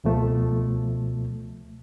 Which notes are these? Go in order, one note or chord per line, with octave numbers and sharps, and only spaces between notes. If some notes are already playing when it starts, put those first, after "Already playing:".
C#2 B2 F3 A3